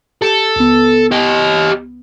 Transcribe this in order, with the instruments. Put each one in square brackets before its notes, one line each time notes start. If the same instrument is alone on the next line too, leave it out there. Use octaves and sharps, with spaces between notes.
[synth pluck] G4 C#7 [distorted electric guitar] A4
[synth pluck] C#2 B3
[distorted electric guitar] G4 D#5